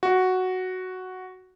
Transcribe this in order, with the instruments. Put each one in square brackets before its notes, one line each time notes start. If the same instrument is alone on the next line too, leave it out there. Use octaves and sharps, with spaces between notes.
[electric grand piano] F#4